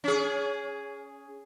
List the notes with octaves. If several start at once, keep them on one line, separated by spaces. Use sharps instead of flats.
C#4 G#4